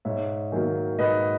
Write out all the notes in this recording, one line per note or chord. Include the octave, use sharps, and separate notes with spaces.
G#2 C#5 E5
D#3 F#3 A#3
G#2 B4 D#5